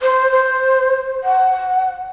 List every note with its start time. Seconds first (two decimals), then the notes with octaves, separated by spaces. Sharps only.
0.01 C5
0.32 C5
1.24 F#5